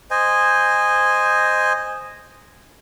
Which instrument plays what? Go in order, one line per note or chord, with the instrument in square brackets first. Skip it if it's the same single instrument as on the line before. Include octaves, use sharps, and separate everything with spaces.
[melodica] C5 D#5 G#5